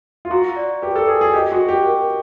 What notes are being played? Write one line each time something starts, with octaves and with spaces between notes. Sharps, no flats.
F4
F#4 A#5
D5
G4 B4
A4
G#4 B4
G#4
G4 D#5
F#4
G5
G4
A#4